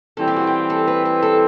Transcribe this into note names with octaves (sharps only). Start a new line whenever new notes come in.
E3 G3 C4 A4
G4
F#4
G4
A4
B4
B4
A4